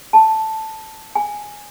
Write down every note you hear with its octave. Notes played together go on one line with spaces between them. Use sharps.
A5
G#5